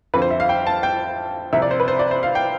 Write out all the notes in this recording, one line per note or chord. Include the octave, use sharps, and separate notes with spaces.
F2 D3 F3 B4
C5
E5
F5
G5
A5
G5
C2 C3 F3 E5
D5
C5
B4
C5
D5
C5
F5
G5